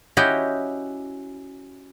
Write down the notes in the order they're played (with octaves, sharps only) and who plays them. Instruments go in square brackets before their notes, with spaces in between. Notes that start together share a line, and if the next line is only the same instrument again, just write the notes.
[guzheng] C#4 E4 F#4 G4 D#5 G5